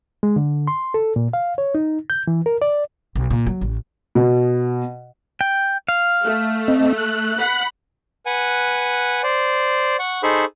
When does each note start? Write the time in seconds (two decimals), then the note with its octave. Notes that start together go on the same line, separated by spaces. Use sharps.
0.23 G#3
0.36 D3
0.67 C6
0.94 A4
1.16 A#2
1.33 F5
1.58 C#5
1.75 D#4
2.10 G6
2.27 E3
2.46 A#4
2.62 D5
3.16 B1
3.30 A#2
3.47 F#3
3.61 A1
4.15 B2
5.41 G5
5.88 F5
6.23 A3
6.68 C4 D#5
6.98 F#6
7.39 F#5 B5
8.26 B4 F#5 G#5
9.23 C5 D5
9.99 F#5 C#6
10.23 D#4 G#4 A4 C5 B5 C#6